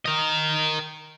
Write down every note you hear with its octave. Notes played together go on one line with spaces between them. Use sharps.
A#4 D#5